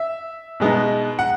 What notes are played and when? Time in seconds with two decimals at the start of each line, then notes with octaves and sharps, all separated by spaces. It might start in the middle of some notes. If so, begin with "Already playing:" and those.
Already playing: E5
0.60 B2 G#3 B3 D#4
1.19 F#5